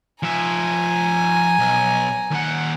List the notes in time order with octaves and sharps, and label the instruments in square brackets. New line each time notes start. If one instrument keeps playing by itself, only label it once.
[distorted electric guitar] F3 E5 [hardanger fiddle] G#5 A#5
[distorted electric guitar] B1
D#2 F#5